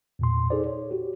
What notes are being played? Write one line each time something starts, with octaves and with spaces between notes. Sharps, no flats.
E2 A#2 C6
D#4 G#4 A4 C5 D5
C#5
F#4 G4